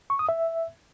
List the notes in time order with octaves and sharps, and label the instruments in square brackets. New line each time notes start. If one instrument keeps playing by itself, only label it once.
[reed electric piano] C#6
D#6
E5